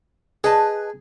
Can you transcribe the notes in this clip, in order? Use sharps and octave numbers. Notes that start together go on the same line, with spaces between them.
G#4 B4 D#5 A5